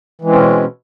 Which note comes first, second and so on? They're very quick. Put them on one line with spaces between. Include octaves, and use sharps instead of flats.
E3 G#3 C4 C#4 B2